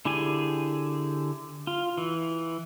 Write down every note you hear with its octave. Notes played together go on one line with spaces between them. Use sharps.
D3 E4 G4 G#4 G#5
F4
E3